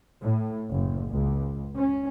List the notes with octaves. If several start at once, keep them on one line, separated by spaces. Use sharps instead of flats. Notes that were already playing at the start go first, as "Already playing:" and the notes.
A2
F#1
C#2
C#4